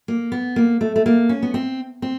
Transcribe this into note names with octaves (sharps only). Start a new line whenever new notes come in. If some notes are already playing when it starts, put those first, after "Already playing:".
A#3
B3
A#3
A3
A3
A#3
C#4
B3
C4
C4